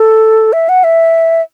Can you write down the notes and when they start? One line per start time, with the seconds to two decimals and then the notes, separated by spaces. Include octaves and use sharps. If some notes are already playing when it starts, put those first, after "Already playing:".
Already playing: A4
0.53 E5
0.69 F#5
0.84 E5